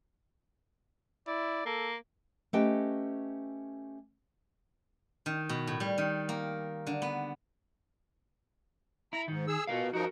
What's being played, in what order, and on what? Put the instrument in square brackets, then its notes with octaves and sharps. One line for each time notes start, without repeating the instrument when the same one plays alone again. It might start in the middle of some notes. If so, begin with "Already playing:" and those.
[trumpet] E4 [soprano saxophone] D5
[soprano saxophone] A#3 [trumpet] A4
[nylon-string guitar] A3 C#4 G4 B4 D#5 G5
[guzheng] D#3
B2
A2
G3
D#3
A#3
D3
B3
[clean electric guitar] E4 [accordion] A#5
[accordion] G#2 [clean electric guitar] D#3
[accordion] G#4 E6
[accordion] B2 [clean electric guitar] F4 A#4 F5
[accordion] F3 D#4 [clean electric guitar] F#4 A#4